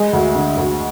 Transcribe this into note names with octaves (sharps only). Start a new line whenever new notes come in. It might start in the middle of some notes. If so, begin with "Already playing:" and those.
Already playing: G#3
D2
D3
D2